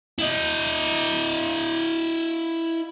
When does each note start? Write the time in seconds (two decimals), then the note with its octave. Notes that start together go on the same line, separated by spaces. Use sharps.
0.19 E4 D#5